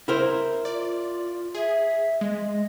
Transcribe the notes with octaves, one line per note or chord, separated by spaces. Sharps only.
E4 A#4 C5
F4 D5
G#4 E5
G#3 D#5